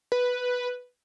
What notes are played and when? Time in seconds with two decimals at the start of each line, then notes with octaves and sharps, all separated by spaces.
0.12 B4